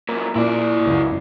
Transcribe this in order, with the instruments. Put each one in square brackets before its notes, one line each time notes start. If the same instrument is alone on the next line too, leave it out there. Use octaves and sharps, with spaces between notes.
[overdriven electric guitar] F#2 A#2 [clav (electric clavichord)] A#4
[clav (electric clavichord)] A#2 [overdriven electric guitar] E4 D5
[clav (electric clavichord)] C#2 F#2